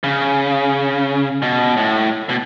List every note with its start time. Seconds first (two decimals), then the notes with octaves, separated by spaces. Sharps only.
0.04 C#3
1.42 B2
1.77 A2
2.29 B2